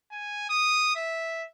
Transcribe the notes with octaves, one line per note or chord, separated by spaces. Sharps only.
G#5
D#6
E5